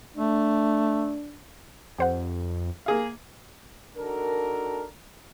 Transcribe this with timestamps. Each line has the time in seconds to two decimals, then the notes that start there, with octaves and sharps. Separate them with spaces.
0.17 A3 D4
1.98 F2 G4 C5 F#5
2.86 A#3 G#4 F5
3.96 D4 D#4 F#4 A4 A#4